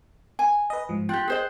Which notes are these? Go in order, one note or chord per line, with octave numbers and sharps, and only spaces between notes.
G#5
B4 D#5
G#2 F3
F4 G4 G5 F#6
G#4 C5 D#5